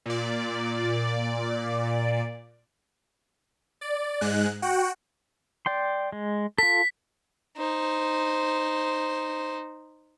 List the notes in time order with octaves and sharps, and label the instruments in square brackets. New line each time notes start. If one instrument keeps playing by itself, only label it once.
[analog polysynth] A#2 D5
[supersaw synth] D5
G#2 G#3 F#6
F#4 F#5 G5
[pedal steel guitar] D5 G5 C6
G#3
[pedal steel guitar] F4 A4 [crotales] B6
[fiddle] D#4 C5